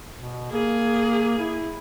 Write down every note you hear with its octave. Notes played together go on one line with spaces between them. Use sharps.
B2
A#3 G#4
E4